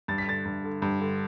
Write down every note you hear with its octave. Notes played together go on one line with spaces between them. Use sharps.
G2 A6
B6
D3 A6
G2
D3
G2
D3